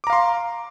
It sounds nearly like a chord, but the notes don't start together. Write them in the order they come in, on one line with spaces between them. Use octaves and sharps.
D6 A#5 F5 C6